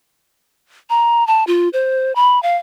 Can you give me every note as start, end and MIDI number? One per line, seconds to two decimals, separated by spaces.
0.90 1.26 82
1.27 1.44 81
1.47 1.69 65
1.73 2.13 72
2.16 2.41 83
2.43 2.57 77